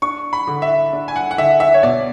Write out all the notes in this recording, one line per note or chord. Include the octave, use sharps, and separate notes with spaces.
D4 C#6
B5
D3
E5
D4
G#5
F#5
F#5
D3 E5
E5
C#5
B2 D5